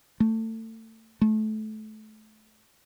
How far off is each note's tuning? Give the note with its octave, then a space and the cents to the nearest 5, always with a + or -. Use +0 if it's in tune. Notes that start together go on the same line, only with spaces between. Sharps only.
A3 +25
A3 -25